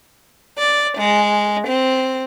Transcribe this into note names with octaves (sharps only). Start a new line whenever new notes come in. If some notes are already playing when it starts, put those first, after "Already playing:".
D5
G#3
C4